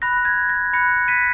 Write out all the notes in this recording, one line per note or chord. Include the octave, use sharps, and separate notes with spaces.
B5 F#6 A#6
G#6
A#6
B5 F#6 A#6 C#7
B6 D#7